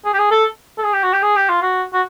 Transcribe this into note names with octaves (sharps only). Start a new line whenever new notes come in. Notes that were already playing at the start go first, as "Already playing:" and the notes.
G#4
G4
G#4
A4
A4
G#4
G4
F#4
G4
G#4
G4
F4
F#4
F#4